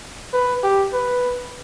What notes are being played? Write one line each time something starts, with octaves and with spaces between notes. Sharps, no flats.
B4
G4
B4